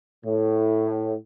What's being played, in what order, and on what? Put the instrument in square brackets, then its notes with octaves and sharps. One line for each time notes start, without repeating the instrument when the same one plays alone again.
[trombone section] A2